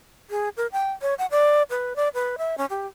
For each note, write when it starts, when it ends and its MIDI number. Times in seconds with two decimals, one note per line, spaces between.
0.30 0.49 68
0.57 0.67 70
0.72 0.92 79
1.02 1.14 73
1.19 1.26 78
1.31 1.63 74
1.70 1.96 71
1.96 2.09 74
2.14 2.36 71
2.38 2.58 76
2.58 2.66 61
2.70 2.87 67